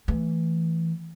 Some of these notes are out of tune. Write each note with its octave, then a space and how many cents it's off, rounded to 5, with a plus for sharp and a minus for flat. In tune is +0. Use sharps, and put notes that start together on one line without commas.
E3 +0 A3 +10